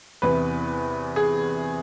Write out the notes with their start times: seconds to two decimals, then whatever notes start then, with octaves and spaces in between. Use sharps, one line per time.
0.22 E2 C3 E3 B4
1.16 G#4